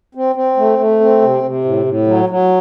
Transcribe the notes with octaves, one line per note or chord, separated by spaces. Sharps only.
C4
C4
A3
A3
C4
C3
C3
A2
A2
F#3
F#3